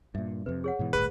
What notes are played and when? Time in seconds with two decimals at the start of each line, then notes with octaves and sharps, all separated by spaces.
0.15 G2 A#2 E5
0.46 F2 C3 B4
0.64 G#4 C#5 F#5
0.79 G#2 B2 E3
0.93 D1 G1 A2 G#4 B4